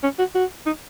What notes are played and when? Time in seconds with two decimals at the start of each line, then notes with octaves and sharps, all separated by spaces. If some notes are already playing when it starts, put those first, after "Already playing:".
0.03 C#4
0.19 F#4
0.35 F#4
0.66 D#4